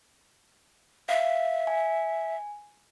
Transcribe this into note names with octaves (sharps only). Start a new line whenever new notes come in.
E5 F5
G#5